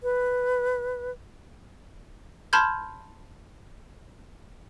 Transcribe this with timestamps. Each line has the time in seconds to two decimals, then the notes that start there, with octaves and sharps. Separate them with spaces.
0.03 B4
2.53 A5 B5 C6 F6 G6 G#6